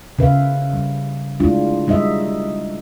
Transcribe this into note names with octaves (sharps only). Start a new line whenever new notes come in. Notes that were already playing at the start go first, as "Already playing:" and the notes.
C#3 B4 E5 F5
G3
G#3 A3 D4 E4 F4
G3 G#3 D#4 D#5 E5